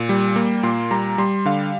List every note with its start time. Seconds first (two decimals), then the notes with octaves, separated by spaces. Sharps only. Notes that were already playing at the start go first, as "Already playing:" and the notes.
Already playing: A#2
0.09 G3
0.36 A#3
0.63 A#2 C6
0.91 G3 A#5
1.18 G3 C6
1.46 D3 F5